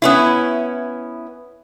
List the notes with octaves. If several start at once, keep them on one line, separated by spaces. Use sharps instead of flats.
B3 C#4 E4